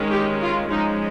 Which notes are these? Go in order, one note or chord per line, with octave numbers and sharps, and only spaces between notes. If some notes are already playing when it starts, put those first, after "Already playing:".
Already playing: D#3 G#3 C#4
G4
F4
F3 G#3 C#4 D#4